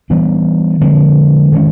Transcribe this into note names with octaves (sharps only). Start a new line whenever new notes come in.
E3 G3 B3 D4
D3 F3 G#3 C4
D#3 G#3 C#4